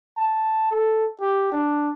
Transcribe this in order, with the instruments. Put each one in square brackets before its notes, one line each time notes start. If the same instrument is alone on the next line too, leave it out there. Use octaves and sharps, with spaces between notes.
[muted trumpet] A5
A4
G4
D4